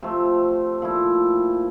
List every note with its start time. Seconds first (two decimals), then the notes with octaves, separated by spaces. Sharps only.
0.02 C3 F3 A3 C4
0.82 A#2 F3 A3 E4